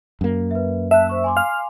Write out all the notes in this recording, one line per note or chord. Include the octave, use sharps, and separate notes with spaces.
F#2 A#3
B4 E5
E5 A5 F#6
C5 C#6 E6
G#5 C6 D6
F5